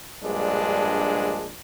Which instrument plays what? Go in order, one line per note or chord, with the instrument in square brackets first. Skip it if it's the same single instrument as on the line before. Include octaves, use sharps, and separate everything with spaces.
[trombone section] A#1 G2 G#3 D4